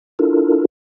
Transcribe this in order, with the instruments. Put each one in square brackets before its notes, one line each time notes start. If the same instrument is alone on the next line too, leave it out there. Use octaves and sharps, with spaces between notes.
[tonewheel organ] D4 E4 F4 A4 A#4